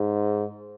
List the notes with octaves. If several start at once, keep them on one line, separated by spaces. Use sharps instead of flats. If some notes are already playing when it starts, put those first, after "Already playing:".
Already playing: G#2